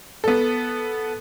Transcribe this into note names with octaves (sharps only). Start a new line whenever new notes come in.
B3 A4